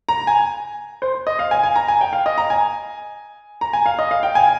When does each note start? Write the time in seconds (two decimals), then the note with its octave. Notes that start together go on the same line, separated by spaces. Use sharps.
0.09 A#5
0.27 G#5
1.02 C5
1.27 D#5
1.39 F5
1.51 G#5
1.63 G#5
1.76 A#5
1.88 G#5
2.01 G5
2.13 F5
2.26 D#5
2.38 A#5
2.50 G#5
3.61 A#5
3.73 G#5
3.86 F5
3.99 D#5
4.11 F5
4.23 G5
4.35 G#5